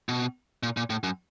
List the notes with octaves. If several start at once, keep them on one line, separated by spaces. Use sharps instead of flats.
B2
A#2
A#2
A2
F#2